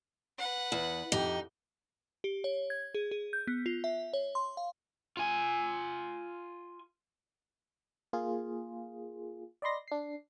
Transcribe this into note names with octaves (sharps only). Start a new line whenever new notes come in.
B4 F#5
E2
F2 D#4 G4
G4
C#5
G#6
G#4
G#4
G6
B3
F4
E5
C#5
C6
F5
F4 G#5
A#3 F4 G#4
D5 D#5 B5 C6 A#6
D4 C7